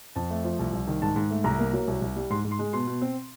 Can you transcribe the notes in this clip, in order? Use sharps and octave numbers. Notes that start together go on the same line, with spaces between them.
F2 A5
A3
F3
C2
C2
D#3
G#2 A5
G#2
A3
C2 A#5
A#3
F#3
C2
C2
G3
G#2 C6
G#2
C6
G#3
B2 C6
B2
C4